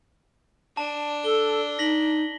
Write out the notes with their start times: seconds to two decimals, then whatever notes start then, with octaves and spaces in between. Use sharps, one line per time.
0.77 D4 A5
1.25 A4 G7
1.79 D#4 A#6 B6 F#7